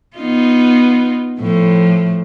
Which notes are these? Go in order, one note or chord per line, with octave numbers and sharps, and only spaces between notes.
B3 D#4 F4
A2 F3